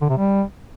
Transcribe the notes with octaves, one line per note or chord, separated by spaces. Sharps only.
D3
C3
G3